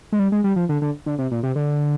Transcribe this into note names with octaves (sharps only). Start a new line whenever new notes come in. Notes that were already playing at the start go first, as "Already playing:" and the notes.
G#3
G3
G#3
G3
F3
D3
D3
D3
C3
A#2
C3
D3